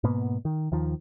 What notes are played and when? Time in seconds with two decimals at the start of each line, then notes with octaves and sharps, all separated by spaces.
0.04 G#2 B2 A#3 B3
0.45 D#3
0.72 D#2 D#3 F3